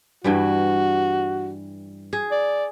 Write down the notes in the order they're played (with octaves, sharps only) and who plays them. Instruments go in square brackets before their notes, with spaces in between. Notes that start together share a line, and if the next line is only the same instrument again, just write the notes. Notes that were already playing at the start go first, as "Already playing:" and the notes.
[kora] G2 E3 G3 [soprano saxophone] F#4
[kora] G#4
[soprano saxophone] D5